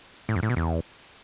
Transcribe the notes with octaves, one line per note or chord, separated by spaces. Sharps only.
A2
F2
A2
B2
E2